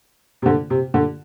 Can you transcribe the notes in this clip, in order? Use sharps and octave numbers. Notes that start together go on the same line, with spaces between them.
C3
D3
C3
D3